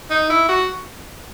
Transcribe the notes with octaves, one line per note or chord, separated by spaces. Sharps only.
D#4
E4
F#4